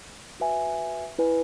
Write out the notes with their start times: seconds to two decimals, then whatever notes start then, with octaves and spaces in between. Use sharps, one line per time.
0.40 F#4 B4 E5 G#5
1.19 E4 B4 D#5 G#5